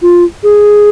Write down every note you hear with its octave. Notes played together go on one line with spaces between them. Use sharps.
F4
G#4